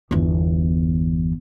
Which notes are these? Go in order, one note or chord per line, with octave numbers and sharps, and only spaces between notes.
G1 E2